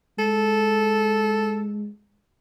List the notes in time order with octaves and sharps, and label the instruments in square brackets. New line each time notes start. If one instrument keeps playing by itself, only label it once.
[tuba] G#3 [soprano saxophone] A4